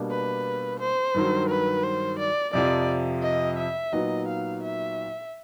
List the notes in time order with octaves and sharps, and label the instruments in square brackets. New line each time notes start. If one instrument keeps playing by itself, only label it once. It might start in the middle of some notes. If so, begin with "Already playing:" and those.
Already playing: [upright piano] B2 G3 A#3 D4
[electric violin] B4
C5
[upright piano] G2 D#3 F#3
[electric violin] B4
C5
D5
[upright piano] F2 C3 F3 [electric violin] D5
[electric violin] D#5
E5
[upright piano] A#2 F#3 B3 D#4 [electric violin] D#5
[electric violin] F5
E5